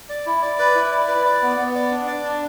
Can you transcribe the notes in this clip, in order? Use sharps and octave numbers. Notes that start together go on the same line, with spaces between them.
D5
E4
D5
B4
E4
D5
B4
D5
B3
B3
D5
D4
D5
D4